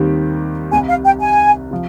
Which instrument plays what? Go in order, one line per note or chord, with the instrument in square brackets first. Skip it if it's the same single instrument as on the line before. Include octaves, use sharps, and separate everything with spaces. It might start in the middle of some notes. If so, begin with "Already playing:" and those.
Already playing: [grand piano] D#2 D#3 G3 C4 G4
[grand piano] C2 C3 G3 [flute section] G#5
[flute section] F5
G5
G#5
[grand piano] C3 F3